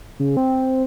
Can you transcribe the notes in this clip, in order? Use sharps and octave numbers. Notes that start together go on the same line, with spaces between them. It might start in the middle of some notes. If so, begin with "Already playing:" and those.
C#3
C4